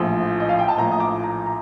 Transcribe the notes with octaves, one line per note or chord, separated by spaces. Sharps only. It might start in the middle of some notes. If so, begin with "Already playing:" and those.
Already playing: A#1 A2 F3
D#5
F5
G5
A5
A#1 A2 F3 A#5
D#6
D6
A#5
A#5